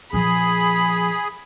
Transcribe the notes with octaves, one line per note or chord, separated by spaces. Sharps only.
A#2 F3 G#4 B5